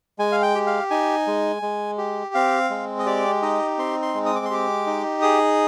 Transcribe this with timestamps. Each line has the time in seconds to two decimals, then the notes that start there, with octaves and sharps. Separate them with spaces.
0.19 G#3 G#5
0.32 F5
0.42 G5
0.55 G4
0.67 F5
0.90 D#4 G#5
1.27 G#3
1.62 G#3
1.98 G4
2.34 C4 F5
2.70 G#3
2.99 D#5
3.06 G4 D5
3.42 D#4 D#5
3.78 C4 C6
4.02 C6
4.14 G#3
4.26 D#6
4.36 D6
4.45 C6
4.50 G4 D6
4.87 D#4
5.22 G#4 D#6